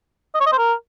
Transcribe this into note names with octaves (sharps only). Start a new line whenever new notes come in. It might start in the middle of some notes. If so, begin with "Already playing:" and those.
D#5
C#5
D#5
C5
A#4